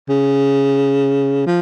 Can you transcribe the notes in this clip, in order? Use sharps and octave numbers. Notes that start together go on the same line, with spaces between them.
C#3
F3